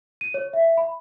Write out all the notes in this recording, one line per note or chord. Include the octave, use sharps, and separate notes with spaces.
D#7
C#5
E5
B5